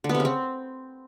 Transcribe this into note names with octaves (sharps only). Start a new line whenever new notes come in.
D3
B3
C3
C#3
C4